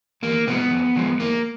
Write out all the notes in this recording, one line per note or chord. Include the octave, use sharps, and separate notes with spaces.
E2 A#3
C3 F3 G#3 B3
F2
D3 F3 G#3
F2 A#3